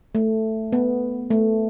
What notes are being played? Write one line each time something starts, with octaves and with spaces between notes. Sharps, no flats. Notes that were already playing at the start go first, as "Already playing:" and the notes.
A3
B3
A3